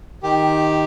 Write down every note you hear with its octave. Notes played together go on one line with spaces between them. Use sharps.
D#3 G4